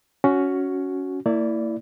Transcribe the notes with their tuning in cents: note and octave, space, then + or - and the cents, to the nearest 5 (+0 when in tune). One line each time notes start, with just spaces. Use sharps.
C#4 +10 F#4 +0
A#3 -35 E4 +0 D5 -10